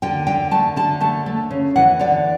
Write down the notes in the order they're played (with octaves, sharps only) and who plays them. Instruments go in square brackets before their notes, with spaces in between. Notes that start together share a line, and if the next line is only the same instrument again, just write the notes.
[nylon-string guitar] D3 G5
D3 G5
A3 A5
D3 A5
A3 A5
A3
C#3
E3 F#5
D3 D5